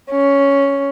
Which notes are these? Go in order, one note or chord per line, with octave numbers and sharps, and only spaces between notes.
C#4